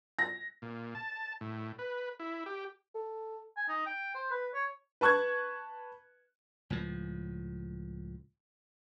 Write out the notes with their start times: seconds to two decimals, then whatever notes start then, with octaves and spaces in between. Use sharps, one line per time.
0.19 A#6
0.62 A#2
0.95 A5
1.41 A2
1.79 B4
2.20 E4
2.46 G4
2.95 A4
3.57 G#5
3.69 D#4
3.86 G5
4.15 C5
4.31 B4
4.54 C#5
5.01 B4 A5 C#6 F#6 G#6
6.70 C#2 A2 F3